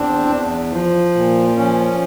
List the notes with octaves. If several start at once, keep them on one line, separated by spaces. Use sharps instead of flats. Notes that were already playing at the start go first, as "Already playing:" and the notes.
Already playing: E2 C4 D4
E2
F3
A#2
F3 C#4